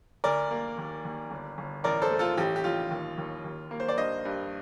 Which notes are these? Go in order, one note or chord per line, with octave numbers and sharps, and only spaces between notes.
D2 A#4 D5
A#3
D#2
D#2
G1
G1
A1 A#4 D5
A4 C5
A3
F4 A4
A1 G4
G4
A1 F4
D#2
D#2
D#2
A#3
C5
D5
G2 C5 D#5
G2